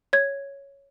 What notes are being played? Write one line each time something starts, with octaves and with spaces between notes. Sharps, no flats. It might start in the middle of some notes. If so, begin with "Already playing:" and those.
C#5 G#6